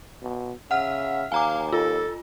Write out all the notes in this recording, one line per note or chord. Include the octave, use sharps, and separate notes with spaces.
B2
C#3 E5 F#5 F6
D#2 F5 G#5 A#5 D6
F4 A4